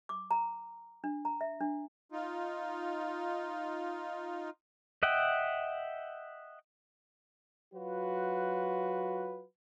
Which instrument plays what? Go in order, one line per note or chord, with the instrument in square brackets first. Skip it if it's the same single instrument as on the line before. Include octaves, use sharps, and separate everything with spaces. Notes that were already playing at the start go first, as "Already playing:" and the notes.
[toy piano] D6
A#5
D4
A#5
E5
D4
[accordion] D#4 F4
[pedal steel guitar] D#5 E5 F#5 G5
[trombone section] F#3 F4 F#4 B4